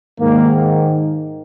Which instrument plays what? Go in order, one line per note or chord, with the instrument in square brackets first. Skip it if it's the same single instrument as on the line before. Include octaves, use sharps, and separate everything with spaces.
[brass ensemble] G#2 D#3 A#3